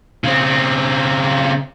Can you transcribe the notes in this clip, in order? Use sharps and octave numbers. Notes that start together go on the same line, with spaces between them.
C#3 C4